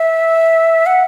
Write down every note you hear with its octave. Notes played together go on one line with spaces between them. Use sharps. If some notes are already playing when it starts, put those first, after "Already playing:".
Already playing: E5
F#5